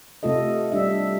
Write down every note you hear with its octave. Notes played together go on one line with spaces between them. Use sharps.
C3 A3 F4 A4 D#5
G3 D4 E5